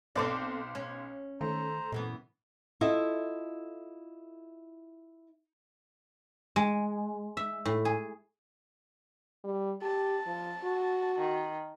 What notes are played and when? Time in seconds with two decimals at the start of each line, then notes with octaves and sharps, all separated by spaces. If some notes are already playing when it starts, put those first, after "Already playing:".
0.16 B1 C4 A4 C5 D5 D6
0.75 C#4
1.41 D#3 A3 C5 A#5
1.92 F#2 A#2 E3 B3
2.81 E4 F4 A4 D#5 E5
6.56 G#3
7.37 E5
7.65 A2
7.85 G#4
9.44 G3
9.82 G4 A5
10.27 F3
10.64 F#4
11.18 D#3